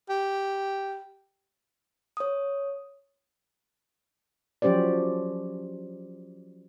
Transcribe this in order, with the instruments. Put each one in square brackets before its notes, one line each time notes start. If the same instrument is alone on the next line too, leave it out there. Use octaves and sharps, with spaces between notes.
[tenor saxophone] G4
[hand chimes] C#5 D#6
[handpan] F3 F#3 C#4 G4 C5 D5